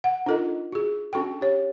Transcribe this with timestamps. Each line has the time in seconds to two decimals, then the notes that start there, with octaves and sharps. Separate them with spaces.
0.04 F#5
0.26 D4 D#4 F4 A4 A#4 D#5
0.72 F#4 G#4
1.13 C#4 D4 F#4 A4 G5
1.41 G4 C#5